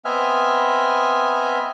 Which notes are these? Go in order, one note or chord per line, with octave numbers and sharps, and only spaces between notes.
B3 C4 D#5 E5 G#5 F6